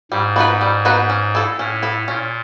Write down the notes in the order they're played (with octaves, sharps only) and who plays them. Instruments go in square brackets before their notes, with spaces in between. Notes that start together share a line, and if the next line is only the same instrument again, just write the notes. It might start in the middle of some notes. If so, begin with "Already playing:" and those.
[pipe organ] G#2 [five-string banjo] G3
[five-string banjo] B3 D#4 F#4 B4
G3
B3 D#4 F#4 B4
C#4
E4 A4
[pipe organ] A2 [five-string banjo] C#4
[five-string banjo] E4 A4
[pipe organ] A#2 [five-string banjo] C#4